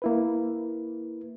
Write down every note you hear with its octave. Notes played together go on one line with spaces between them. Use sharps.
A#3 E4 B4